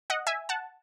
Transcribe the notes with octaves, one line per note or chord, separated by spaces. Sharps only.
D#5 F#5
E5 G#5
F#5 A5